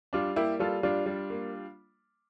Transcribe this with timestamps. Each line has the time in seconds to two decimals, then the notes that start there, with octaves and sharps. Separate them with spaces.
0.13 G3 D4 F4
0.36 A#3 E4 G4
0.60 G3 F4 A4
0.83 G3 D4 F4
1.06 G3
1.30 A#3